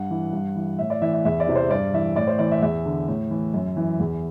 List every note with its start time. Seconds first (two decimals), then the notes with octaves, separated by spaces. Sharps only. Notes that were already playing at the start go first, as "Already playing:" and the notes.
Already playing: G2 F#5
0.11 E3
0.33 G2
0.56 E3
0.79 A2 E5
0.90 D5
1.02 E3 E5
1.14 E5
1.25 E2 E5
1.40 D5
1.47 C3 E3
1.56 C5
1.70 G2 D5
1.94 E3 E5
2.16 A2 D5
2.27 C5
2.39 E3 D5
2.51 E5
2.62 E2 E5
2.86 D3
3.08 A2
3.31 E3
3.54 F#2
3.77 E3
4.00 E2